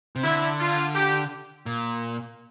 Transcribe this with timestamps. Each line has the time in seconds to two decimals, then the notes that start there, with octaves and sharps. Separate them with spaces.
0.16 C3
0.24 D3 E4
0.59 F4
0.95 G4
1.66 A#2